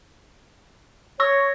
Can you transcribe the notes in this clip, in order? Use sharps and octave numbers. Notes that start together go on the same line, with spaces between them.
C#5 C#6 E6 A#6